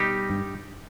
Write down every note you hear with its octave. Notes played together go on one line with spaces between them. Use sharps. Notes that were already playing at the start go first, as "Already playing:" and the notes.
Already playing: B2 G3 D#4 G4
G2